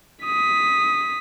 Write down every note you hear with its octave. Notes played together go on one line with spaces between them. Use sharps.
D#6 B6